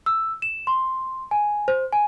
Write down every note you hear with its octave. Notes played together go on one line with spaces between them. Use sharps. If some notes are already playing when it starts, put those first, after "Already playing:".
E6
E7
C6
G#5
C5
G#5